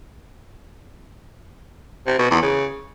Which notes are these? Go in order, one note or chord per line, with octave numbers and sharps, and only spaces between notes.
C3
B2
E2
C#3